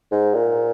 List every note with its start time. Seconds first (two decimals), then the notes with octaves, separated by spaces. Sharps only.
0.12 G#2
0.34 A#2